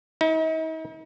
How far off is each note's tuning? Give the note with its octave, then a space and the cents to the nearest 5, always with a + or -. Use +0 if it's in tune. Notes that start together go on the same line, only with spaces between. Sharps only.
D#4 +45